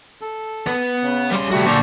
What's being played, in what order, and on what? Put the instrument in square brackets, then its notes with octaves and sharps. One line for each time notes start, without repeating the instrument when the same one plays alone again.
[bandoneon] A4
[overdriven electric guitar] B3 B4
[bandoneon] C#3
[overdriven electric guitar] G3 C6
[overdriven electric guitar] C3 F#4 [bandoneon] G3 A3
[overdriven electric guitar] A#2 D3 [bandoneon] D4 C5 C#6